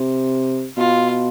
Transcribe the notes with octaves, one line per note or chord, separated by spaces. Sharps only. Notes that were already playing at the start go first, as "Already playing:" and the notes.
Already playing: C3
B2 F4